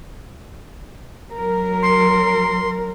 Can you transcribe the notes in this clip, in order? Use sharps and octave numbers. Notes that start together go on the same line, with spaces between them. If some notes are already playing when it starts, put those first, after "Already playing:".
F#3 A#4
C6